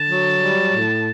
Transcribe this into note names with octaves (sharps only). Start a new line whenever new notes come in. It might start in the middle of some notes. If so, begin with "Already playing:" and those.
Already playing: D3 A5
F#3
G3
A2